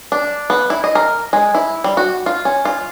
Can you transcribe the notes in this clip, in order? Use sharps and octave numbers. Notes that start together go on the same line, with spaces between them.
D4
B3
E4
D#5
A#4
G#3
E4
G3
F#4
F4
C#4
F4